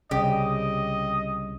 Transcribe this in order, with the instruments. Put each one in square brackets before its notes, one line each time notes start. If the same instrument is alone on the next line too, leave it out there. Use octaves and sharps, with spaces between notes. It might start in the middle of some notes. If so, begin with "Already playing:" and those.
[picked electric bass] C2 C#3 [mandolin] G4 [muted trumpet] D#5